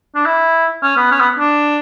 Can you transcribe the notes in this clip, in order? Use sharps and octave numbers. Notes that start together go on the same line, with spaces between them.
D4
E4
C#4
B3
C#4
B3
D4